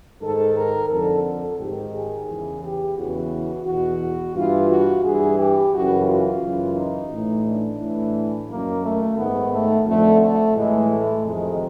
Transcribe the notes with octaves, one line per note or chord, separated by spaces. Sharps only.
G#2 D#3 A4
A#4
F2 D3 A4
A4
G#2 D#3 G4
G#4
E2 C#3 E3
G4
E2 C#3 E3 F#4
E2 B2 F#4
G2 E3 F4
F#4
G2 E3 G#4
G4
F#2 C#3 E3 F#4
F4
F#2 C#3 E3
D#4
A2 E3
D4
A2 E3
F#2 D#3 A#3
A3
G#2 D#3 B3
A3
F2 D3 A3
A3
A2 E3 G#3
A3
F2 C3 D#3 G#3